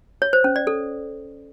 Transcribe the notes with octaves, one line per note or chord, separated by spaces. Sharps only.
C#5
C5
C#4
D5
A4